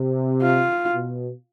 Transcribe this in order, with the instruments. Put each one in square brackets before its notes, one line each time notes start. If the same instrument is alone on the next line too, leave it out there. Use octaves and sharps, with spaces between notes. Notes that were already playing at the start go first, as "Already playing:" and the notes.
Already playing: [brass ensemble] C3
[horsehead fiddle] F4
[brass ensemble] B2